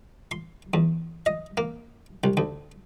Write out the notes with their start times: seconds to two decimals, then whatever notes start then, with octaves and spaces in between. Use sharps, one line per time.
0.31 C6
0.74 E2
1.26 D#5
1.57 A#3
2.24 C2
2.37 D2